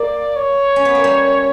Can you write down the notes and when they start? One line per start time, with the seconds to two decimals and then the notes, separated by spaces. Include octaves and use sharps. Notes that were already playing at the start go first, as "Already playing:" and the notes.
Already playing: A#3 D5
0.36 C#5
0.76 C#4
0.85 B3
0.95 A#3
1.04 G3